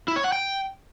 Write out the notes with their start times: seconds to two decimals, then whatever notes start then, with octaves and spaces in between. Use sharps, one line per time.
0.08 E4
0.16 C#5
0.24 F#5
0.32 G5